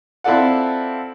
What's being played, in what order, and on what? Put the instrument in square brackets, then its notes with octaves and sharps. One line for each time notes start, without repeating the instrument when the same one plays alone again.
[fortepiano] C4 E4 F4 A4 D5 F#5